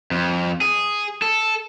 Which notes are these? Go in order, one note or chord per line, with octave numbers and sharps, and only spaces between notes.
F2
G#4
A4